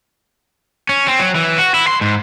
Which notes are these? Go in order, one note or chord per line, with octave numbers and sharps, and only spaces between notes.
C#4
C4
F#3
E3
F#4
E4
C6
G#2